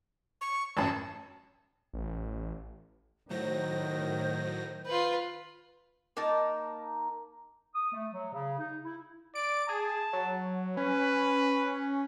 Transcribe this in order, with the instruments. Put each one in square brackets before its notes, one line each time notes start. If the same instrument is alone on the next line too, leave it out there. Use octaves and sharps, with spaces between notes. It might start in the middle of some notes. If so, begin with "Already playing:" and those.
[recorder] C#6
[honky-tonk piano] A1 F#2 [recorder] A5
[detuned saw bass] A1
[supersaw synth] A2 F#3 A#6 [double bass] D#3 [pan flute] C5
[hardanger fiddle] F4 B4
[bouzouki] A#3 D#4 A#4 A5
[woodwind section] D#6
A3
F#3
C#3
D#4
E4
[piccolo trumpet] D5 [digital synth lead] D7
[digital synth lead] G#4 [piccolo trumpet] A5
[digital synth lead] F#3
[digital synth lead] C#4 [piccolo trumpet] B4